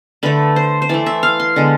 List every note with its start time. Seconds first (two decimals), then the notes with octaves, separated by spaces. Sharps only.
0.23 D3 A3 B4
0.56 C5
0.82 C5
0.89 E3 A3 D5
1.06 E5
1.23 F5
1.40 C6
1.56 D3 G#3 B3